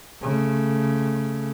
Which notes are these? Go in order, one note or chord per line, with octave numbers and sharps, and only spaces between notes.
C#3 A3